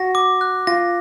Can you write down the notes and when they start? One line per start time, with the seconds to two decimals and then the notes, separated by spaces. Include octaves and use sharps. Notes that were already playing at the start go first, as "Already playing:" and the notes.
Already playing: F#4 A#6
0.15 D6
0.41 F#6
0.67 F4 A#6